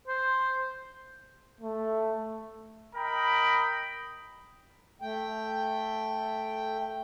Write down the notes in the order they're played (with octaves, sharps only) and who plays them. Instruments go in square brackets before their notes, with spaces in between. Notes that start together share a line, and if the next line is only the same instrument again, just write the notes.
[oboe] C5
[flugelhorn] A3
[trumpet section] A#4 D#5 G5 B5
[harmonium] A3 G5